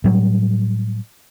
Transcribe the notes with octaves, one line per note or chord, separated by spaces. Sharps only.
A2 F#3 G3